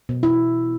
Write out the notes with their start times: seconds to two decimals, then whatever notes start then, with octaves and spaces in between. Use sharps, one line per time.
0.09 B2
0.23 E4